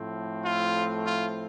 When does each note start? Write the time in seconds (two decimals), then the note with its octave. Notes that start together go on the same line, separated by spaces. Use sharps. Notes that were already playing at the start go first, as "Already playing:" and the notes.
Already playing: A2 F3 A3 C4
0.44 F4
1.05 F4